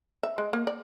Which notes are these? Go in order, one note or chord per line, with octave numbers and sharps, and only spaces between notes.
E5
G#3
A#3
D5